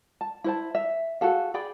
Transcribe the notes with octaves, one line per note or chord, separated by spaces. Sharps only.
A5
E4 C5 A5
E5
F#4 G#4 A4 F5
G#4 D5 G5 B5